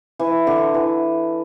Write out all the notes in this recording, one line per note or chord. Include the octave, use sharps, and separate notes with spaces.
E3
D3
E3